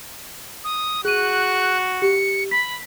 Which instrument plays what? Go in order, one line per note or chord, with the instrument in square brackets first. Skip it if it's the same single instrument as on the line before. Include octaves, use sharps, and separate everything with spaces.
[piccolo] D#6
[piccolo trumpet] F#4 [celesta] G#4 D#7 [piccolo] F#6
[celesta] G4 [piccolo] C#7
[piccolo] B5 [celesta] B6